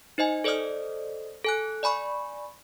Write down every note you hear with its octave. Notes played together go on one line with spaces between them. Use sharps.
D#4 C5 D#5 G#5
A4 C5 D5 D#5 D#6 F6
A4 G#5 F#6
D5 G#5 B5 C#6